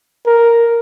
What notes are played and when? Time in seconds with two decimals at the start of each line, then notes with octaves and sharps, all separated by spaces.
0.26 A#4